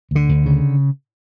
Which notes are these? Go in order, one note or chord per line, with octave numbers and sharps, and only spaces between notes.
D2 D3
D2
C#3